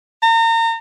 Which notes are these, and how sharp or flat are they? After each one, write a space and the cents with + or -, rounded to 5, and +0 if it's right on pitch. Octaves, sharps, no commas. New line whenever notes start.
A#5 -35